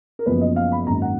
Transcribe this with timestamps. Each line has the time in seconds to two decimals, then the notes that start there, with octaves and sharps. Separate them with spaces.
0.19 A#4
0.26 F#1 F#2 F3 B3 B4
0.41 D#5
0.56 F5
0.72 B5
0.87 G#1 F#2 D#3 A#3 A#5
1.02 F#5